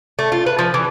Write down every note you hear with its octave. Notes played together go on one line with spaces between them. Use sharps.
A3
F4
B4
F3
E3